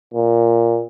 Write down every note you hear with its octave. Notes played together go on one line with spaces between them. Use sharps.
A#2